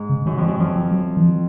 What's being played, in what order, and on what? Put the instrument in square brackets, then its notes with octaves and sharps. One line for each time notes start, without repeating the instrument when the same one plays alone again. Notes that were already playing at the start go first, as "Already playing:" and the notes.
Already playing: [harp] G#2
[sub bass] C#3
[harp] F#2 [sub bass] D#3
[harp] F2 [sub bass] E3
[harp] F#2
[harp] F2 [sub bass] F3
[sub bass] F3
F#3
E3
F3